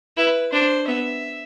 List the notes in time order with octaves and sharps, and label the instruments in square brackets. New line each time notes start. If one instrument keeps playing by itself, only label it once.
[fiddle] E4 [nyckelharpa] B4
[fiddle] D4 [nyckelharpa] C5
[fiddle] B3 [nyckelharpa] E5